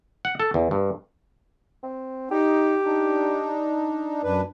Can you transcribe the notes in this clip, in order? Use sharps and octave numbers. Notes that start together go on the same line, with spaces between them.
F#5
A4
E2
G2
C4
D#4 G4
D4 D#4
F#2 D4 B4